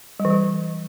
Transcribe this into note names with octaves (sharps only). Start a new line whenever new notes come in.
G3
E3
G3